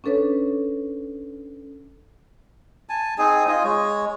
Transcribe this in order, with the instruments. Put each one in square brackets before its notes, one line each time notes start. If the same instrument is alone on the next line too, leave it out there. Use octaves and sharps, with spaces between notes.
[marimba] C#4 D4 A4 B4 C#5
[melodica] G#5 A5
C4 D#4 G#4 G#5
D#4 F4 D#5 G#5
G#3 C#5